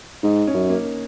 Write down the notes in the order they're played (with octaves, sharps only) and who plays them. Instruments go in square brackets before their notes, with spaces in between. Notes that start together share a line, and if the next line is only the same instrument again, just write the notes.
[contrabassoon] G#2 [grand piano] D#4
[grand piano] C#4
[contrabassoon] F#2
[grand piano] A#3